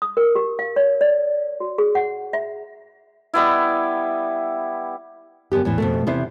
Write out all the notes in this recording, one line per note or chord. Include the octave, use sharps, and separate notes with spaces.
D#6
A#4
G4
F5
C#5
D5
F#4
G#4
F#5
E5
G3 B3 E4
F#2 D3 B3 G4
E2 A2 E3
F2 B2 A3
E2 C3 B3 E4 C5